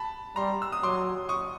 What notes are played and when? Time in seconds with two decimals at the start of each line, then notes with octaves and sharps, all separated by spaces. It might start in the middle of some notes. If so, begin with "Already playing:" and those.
Already playing: A5 B5
0.36 G3 A#5 C6
0.62 E6
0.72 D#6
0.82 F#3 C6 D6
1.29 C#6 D#6